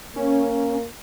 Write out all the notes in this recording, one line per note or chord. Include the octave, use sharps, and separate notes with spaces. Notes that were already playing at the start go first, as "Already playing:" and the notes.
A#3 C#4